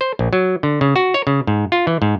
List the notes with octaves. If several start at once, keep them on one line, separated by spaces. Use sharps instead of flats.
C5
A#1
F#3
D3
C#3
F#4
C#5
C#3
G#2
F4
E3
G#2